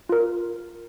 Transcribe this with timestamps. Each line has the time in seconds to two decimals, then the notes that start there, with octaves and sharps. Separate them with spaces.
0.09 F4 A#4